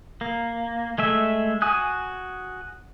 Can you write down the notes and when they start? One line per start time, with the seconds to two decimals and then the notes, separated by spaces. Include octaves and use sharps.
0.21 A#3
0.98 G#3 A3 E5
1.62 F#4 G#5 D#6 F#6